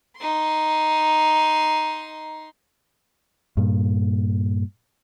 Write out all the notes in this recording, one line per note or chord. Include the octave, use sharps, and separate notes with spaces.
D#4 C6
G2 A#2